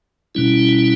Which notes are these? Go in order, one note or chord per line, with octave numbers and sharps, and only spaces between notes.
B2 G3 C#4 E4